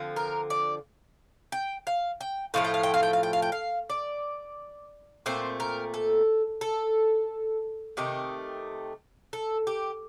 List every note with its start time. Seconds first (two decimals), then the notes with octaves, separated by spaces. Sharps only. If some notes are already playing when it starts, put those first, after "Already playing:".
Already playing: D3 F3 C4
0.16 A#4
0.50 D5
1.52 G5
1.87 F5
2.21 G5
2.54 A2 F3 A3 F5
2.64 G5
2.74 F5
2.83 G5
2.94 F5
3.03 G5
3.13 F5
3.23 G5
3.33 F5
3.42 G5
3.52 F5
3.90 D5
5.26 A#2 A3 C4 C5
5.60 A#4
5.94 A4
6.61 A4
7.97 C3 D#3 A3 G4
9.33 A4
9.67 G4